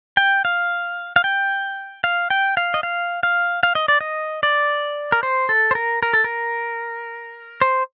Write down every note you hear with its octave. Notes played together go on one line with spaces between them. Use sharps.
G5
F5
F5
G5
F5
G5
F5
D#5
F5
F5
F5
D#5
D5
D#5
D5
A#4
C5
A4
C5
A#4
A#4
A4
A#4
C5